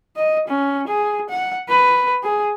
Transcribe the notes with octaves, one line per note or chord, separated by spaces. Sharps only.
D#5
C#4
G#4
F#5
B4
G#4